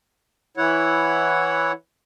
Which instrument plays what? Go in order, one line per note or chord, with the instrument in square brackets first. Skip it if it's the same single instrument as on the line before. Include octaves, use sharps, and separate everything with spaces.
[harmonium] E3 E4 C#5 F#5